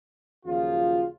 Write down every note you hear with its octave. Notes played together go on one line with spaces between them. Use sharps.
D#2 C#3 F3 F#3 F4